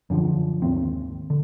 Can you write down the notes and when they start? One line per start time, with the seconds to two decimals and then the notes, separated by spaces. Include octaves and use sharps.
0.10 F#2 D3 D#3 F3
0.62 G#1 D#2 C4
1.30 D3